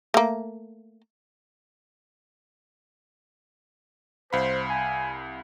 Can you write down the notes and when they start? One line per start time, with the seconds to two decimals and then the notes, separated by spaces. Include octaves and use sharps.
0.14 A3 A#3
4.33 C2 C5 F5 B5
4.70 G#5